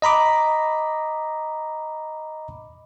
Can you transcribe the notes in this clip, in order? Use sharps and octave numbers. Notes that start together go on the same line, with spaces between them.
D#5 A#5 B5 D6